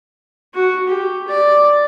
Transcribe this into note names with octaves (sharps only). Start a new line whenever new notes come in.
F#4
G4
D5